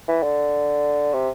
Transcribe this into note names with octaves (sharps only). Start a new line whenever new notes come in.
E3
D3
C3